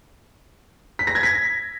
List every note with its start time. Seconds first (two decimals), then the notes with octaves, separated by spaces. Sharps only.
0.99 B6
1.07 A#6
1.15 G#6
1.23 B6